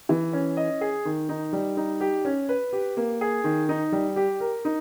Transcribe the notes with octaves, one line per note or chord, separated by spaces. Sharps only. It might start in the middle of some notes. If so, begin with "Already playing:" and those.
E3
C#4
D#5
G#4
D#3
D#4
G3
D#4
G4
C#4
B4
G4
A#3
G#4
D#3
D#4
G3
G4
A#4
D#4